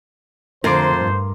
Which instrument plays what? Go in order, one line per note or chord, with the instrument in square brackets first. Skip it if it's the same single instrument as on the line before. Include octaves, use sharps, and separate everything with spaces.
[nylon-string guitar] F2 [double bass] D3 A3 [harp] A#4 C6 D6 [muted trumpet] C5
[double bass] G2